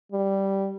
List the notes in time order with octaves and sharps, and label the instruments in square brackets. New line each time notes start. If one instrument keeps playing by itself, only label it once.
[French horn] G3